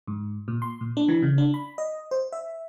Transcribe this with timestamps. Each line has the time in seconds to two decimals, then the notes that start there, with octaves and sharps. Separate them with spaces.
0.07 G#2
0.48 A#2
0.62 C6
0.81 A#2
0.97 D4
1.08 E3
1.22 C#3
1.38 D4
1.54 B5
1.78 D#5
2.11 C5
2.32 E5